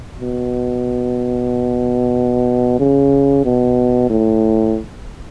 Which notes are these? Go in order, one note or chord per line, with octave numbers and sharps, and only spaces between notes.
B2
C#3
B2
A2